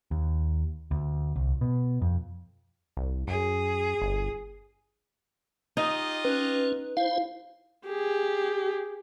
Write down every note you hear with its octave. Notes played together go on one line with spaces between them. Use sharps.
D#2
D2
C2
B2
F2
C2
F#2 G#4
G1
D#4 F4 G4 D#5
C#4 B4
E4 C5 F5
G4 G#4